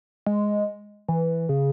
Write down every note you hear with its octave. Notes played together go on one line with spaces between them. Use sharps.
G#3
E3
C#3